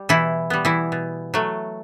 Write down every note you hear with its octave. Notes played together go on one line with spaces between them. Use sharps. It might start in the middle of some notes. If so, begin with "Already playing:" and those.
Already playing: G3
B2 E3 E4
G3 B3
E3 E4
B2
F#3 A3